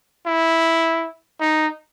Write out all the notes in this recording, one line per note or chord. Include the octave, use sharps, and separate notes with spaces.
E4
D#4